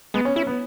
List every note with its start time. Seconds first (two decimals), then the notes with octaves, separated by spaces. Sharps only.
0.14 G#3 B3
0.25 C#4
0.36 C#4 E4
0.47 B3